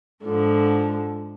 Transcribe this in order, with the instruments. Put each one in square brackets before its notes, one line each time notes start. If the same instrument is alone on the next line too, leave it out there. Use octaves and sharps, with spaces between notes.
[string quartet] G#2 D3 F3